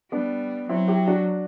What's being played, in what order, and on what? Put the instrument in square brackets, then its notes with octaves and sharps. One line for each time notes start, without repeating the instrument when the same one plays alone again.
[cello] G3 [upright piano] B3 D4
[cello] F#3 [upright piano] C4 E4
[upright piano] E4 G4
D4 F#4